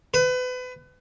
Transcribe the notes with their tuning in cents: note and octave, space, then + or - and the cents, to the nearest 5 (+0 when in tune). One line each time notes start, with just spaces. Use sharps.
B4 +30